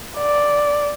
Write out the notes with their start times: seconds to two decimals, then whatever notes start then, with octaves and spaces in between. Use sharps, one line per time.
0.17 D5